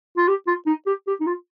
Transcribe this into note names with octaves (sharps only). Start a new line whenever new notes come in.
F4
G4
F4
D#4
G4
G4
D#4
F4